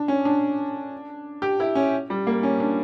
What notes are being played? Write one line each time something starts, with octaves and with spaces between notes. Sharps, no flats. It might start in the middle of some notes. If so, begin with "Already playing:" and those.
Already playing: D4
C#4
D4
G4
E4
C#4
G3
A#3
C#4
D4